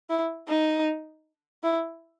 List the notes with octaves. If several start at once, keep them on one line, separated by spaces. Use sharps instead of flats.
E4
D#4
E4